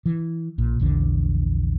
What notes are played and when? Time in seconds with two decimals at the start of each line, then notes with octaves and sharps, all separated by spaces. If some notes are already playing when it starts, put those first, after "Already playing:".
0.06 E3
0.58 A#1 A#2
0.80 A#1 E2 D3